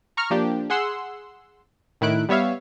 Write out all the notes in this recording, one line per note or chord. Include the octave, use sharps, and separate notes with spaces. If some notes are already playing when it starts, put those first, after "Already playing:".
A#5 C#6 F6
F3 A#3 D4 G4
G#4 F#5 C6 E6
A2 D#3 E4 F#6 D7
G3 B3 C#5 E5 F5